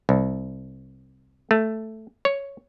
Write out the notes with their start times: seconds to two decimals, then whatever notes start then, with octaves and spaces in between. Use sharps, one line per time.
0.09 C2
1.51 A3
2.25 C#5